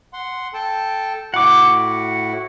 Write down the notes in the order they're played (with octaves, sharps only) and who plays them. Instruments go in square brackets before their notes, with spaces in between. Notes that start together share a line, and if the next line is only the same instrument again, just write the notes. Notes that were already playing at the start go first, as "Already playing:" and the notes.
[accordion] F#5 C6
A4 G5 A5
[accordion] A2 E4 F#4 [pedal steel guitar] F#5 D6